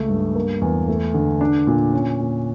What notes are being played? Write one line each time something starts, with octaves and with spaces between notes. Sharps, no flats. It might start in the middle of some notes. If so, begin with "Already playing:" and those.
Already playing: C#2 A3
G2
A#3
E2
A3
D3
D4
A#2
C#4
A#2